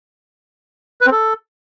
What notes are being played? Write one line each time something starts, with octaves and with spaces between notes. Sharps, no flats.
B4
C4
A4